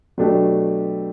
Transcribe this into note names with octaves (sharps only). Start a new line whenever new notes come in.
B2 F#3 A3 D4 G4